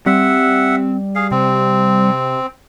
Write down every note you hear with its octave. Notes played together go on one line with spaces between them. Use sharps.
G3 C4 E5 F#5
G#4 F5
C3 C4